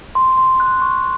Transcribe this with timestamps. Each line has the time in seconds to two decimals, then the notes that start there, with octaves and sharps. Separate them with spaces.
0.15 C6
0.37 C6
0.60 F#6
0.82 C#6